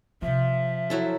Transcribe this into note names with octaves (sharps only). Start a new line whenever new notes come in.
C3 F3 C4 E5
F#3 E4 A4